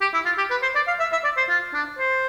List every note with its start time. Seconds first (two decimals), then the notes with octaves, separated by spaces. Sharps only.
0.01 G4
0.13 E4
0.26 F4
0.38 G4
0.50 B4
0.63 C5
0.75 D5
0.87 F5
1.00 E5
1.12 E5
1.24 D5
1.37 C5
1.49 F4
1.74 D4
1.99 C5